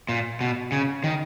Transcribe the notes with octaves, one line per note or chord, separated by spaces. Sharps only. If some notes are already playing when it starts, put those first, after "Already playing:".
A#2
B2
C#3
D#3